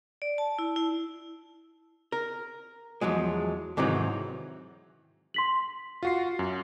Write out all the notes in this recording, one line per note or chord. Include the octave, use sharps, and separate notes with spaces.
D5
A5
E4
E4
A#4
E2 F3 F#3 G#3
G#2 C3 D#3 E3 F#3
C6 B6 F#7
F4 F#4 C7
F#2